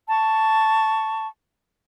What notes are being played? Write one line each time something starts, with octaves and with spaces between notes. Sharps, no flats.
A5 C#6